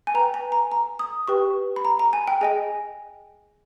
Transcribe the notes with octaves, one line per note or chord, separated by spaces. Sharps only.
G#5
B4 A#5
G5
G#5
A#5
A#5
D#6
G4 B4 G5 C#6
B5
A#5
A#5
G#5
G5
G#4 D#5 G5 G#5